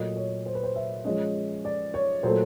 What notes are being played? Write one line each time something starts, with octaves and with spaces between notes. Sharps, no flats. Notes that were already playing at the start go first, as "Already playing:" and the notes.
Already playing: A#2 F#3 A3 D#5
C#5
C5
B4
C5
E5
F3 G#3 C#4 D#5
D5
C#5
A#2 F#3 A3 C5